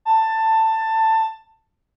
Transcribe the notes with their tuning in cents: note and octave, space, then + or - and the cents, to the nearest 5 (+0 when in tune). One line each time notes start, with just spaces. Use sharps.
A5 +15